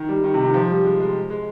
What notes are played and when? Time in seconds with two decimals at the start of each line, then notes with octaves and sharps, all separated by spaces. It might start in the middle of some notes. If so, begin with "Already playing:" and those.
Already playing: D#3
0.09 G3
0.24 D#3
0.34 C3
0.45 D#3
0.54 F3
0.70 G3
0.85 G#3
1.00 G#3
1.30 G#3